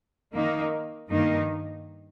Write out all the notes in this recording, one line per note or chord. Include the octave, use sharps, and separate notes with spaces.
D#3 A#3 D#4
G2 D#3 A#3 D#4